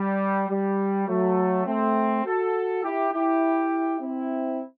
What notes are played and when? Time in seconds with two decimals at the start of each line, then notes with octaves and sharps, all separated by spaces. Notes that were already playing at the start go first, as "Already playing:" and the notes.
Already playing: G3
0.49 G3
1.08 F#3 A3
1.66 A3 C4
2.25 F#4 A4
2.84 E4 G4
3.13 E4 G4
4.01 C4 E4